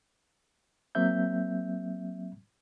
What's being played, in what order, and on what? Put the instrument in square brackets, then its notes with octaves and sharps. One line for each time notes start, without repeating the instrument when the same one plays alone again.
[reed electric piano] F#3 A#3 C4 E5 G6